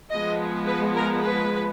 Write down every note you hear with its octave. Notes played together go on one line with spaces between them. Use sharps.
F3 G#3 B3 D#5
B4
A#4
B4